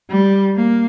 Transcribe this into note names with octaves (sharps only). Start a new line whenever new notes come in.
G3
A#3